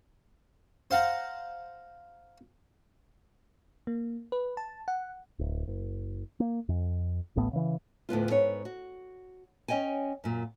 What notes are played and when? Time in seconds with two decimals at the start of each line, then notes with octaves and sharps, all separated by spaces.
0.91 C5 F5 F#5 A#5
3.87 A#3
4.32 B4
4.57 A5
4.88 F#5
5.39 D1
5.68 F#1
6.40 A#3
6.69 F2
7.36 D1 A1 A2 B3
7.53 C#3 E3
8.09 D2 A2 B3 F4
8.30 G#2 B3 C#5
8.65 F#4
9.68 C#4 C#5 D#5 G5 G#5
10.24 F#2 A#2